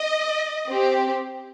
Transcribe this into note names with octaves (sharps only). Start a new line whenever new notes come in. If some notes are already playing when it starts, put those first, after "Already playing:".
Already playing: D#5
C4 G4